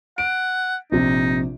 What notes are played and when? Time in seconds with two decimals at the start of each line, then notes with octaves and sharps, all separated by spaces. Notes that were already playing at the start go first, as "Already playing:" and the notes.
0.18 F#5 D7
0.92 A#1 C3 D#4